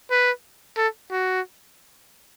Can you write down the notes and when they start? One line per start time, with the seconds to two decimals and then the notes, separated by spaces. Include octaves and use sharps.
0.11 B4
0.77 A4
1.11 F#4